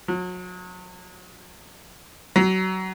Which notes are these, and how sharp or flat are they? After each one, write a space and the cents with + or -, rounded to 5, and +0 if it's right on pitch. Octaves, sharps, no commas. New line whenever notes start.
F#3 -35
F#3 +25